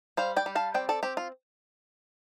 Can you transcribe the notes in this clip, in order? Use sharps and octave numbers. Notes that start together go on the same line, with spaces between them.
G3 C5 F5
D5 G5
G3
F5 A5
C4 D5 G5
A4 D5
C4 G4
F4